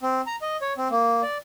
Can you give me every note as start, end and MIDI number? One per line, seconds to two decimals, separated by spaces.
0.02 0.21 60
0.27 0.36 82
0.42 0.57 75
0.61 0.73 73
0.78 0.88 60
0.91 1.22 58
1.22 1.38 74